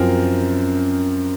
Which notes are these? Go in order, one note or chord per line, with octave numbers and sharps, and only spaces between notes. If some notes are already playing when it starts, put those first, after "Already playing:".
Already playing: F#2 F3 C4 A#4